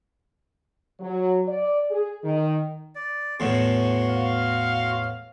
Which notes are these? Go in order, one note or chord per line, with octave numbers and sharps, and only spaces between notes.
F#3
D5
G#4
D#3
D5
E2 A2 F#4 C6 C#6
F5